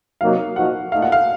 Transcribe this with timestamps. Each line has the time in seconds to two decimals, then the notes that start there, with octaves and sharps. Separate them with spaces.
0.21 C3 F#3 A#3 D#4 F#4 F5
0.56 A#2 F3 A#3 D#4 F#4 F#5
0.92 A#2 A3 D#4 F5
1.02 F#5
1.12 F5